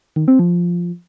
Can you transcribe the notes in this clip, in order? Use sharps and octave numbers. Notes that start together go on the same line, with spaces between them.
D#3
C4
F3